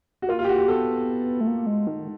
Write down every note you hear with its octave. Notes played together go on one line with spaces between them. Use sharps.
F#4
A#3 F4
F4
G4
F#4
G4
B3 A4
A3
A#3
G#3
D#3